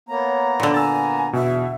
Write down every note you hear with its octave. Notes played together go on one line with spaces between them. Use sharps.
A#3 B3 C#5 A#5
A#2 D3
G#5 E6 A6
E2 B2 E5